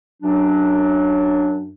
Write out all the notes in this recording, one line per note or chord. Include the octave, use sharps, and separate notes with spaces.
F#2 F#3 D4